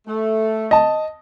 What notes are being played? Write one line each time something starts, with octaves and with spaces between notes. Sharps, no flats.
A3
D#5 A5